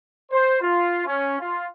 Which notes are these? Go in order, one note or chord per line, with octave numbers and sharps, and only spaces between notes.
C5
F4
C#4
F4